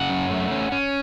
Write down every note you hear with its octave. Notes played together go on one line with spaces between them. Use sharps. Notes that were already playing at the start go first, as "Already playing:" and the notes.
Already playing: C#3 F#5
F#2
A3
C#4
C#4